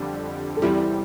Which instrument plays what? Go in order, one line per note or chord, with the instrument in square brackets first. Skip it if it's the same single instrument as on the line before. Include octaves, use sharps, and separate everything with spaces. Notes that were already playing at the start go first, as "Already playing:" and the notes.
Already playing: [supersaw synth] F2 D3 G3
[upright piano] A4
[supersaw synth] E2 C3 G3 [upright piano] E4 G4